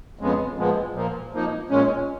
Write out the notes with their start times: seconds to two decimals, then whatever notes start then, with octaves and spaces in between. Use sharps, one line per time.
0.19 F2 C#3 G#3 B3
0.57 A#2 F3 G#3 B3
0.94 A#2 F3 A#3
1.31 F2 F3 A#3 D#4
1.70 A#2 G#3 C#4